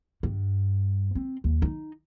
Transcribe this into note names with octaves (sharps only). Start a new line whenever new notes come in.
G2
C4
D#2
D#4